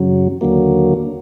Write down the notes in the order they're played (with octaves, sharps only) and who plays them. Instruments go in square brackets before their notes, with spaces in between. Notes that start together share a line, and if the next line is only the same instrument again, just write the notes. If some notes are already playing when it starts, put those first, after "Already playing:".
Already playing: [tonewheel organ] F#2 C#3 F#3
D#2 D3 F#3 A#3